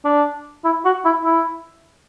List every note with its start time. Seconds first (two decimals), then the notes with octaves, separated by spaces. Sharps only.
0.05 D4
0.65 E4
0.85 F#4
1.05 E4
1.24 E4